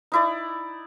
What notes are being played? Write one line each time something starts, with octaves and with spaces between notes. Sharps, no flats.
D#4 E4 D5